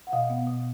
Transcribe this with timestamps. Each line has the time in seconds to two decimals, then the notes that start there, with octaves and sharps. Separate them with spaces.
0.07 F#5
0.12 B2 D#5 F5
0.30 B3
0.47 B2